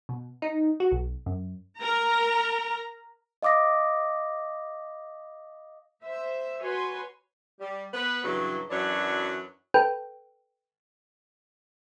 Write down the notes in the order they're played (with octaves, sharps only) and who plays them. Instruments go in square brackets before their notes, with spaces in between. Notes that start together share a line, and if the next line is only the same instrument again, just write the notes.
[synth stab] B2
D#4
F#4
B1
F#2
[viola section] A#4 A#5
[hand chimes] D#5 F5 D6 D#6 A#6
[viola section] C5 E5
F#4 B4 C#5 G#5 C6
[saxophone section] G3
B3 B4
G2 C#3 E3 F#3
F#2 E3 F#3 D4 C#5
[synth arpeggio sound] A4 B4 G5